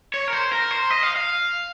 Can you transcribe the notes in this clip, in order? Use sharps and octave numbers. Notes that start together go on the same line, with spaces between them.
C#5
A#4
C5
A#4
C5
D#5
F5
F5